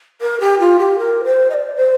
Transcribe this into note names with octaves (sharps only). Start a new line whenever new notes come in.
A#4
G4
F4
G4
A#4
C5
D#5
D5
C5